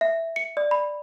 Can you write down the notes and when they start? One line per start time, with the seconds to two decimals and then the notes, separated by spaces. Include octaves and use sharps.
0.01 E5
0.36 C#7
0.57 D5
0.71 B5